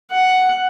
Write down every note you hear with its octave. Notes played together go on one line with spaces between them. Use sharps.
F#5